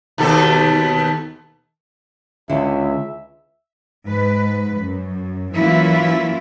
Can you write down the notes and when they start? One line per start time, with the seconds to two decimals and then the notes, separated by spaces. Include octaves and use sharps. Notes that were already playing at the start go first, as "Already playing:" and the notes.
0.18 D#2 B2 A4
2.50 C#2 D3 E4 E5
4.07 G#2 B4
4.78 F#2
5.54 E3 F#3 A#3 C#4 E4 F4